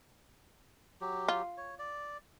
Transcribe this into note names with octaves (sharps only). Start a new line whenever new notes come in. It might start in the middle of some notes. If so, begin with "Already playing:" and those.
F#3 G4
F4
C#5
D5